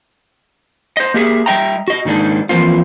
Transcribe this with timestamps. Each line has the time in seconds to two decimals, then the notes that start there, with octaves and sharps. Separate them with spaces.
0.97 C5 D#5
1.14 A#3 G4 G#4 E5
1.46 G3 D#5 E5 G5 A#5
1.88 F#4 D#5
2.05 G#2 D#3 G#3 A#3 D4 D#4
2.49 E3 F3 A#3 C4 F4